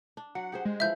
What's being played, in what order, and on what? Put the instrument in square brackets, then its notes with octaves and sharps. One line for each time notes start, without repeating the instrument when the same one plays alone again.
[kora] D4
[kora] F#3 [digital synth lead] F#5
[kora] G4 G#4 C5 [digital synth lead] F#5
[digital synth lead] G#3
[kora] E3 F3 E4 [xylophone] E5 G6